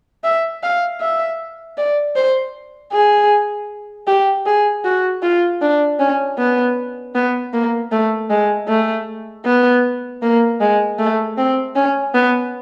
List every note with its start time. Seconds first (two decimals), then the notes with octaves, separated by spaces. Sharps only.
0.24 E5
0.63 F5
1.01 E5
1.78 D5
2.16 C5
2.93 G#4
4.07 G4
4.46 G#4
4.85 F#4
5.23 F4
5.61 D4
5.99 C#4
6.38 B3
7.15 B3
7.53 A#3
7.92 A3
8.30 G#3
8.68 A3
9.46 B3
10.23 A#3
10.61 G#3
10.99 A3
11.38 C4
11.75 C#4
12.14 B3